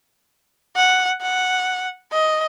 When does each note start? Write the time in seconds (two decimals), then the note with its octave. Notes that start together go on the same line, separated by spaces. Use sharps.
0.76 F#5
1.22 F#5
2.12 D#5